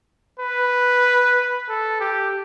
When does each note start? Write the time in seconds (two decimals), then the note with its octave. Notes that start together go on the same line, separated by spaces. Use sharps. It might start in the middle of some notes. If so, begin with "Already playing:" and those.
0.40 B4
1.69 A4
2.01 G4